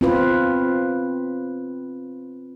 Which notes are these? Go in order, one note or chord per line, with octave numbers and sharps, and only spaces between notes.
C4 F4 B4